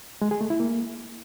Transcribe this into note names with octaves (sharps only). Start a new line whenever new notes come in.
G#3
G#4
A3
E4
A#3